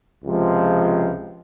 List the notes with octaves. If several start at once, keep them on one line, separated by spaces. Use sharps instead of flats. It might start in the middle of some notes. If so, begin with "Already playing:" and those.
C#2 C3 F3 G#3